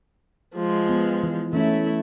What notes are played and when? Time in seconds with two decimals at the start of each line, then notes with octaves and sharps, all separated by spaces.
0.55 F3 G#3
0.89 B3
1.23 E3
1.53 E3 A3 C#4 E4